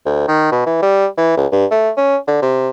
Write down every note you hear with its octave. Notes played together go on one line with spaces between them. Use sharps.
D2
D#3
B2
E3
G3
E3
C#2
G2
A3
C#4
D3
C3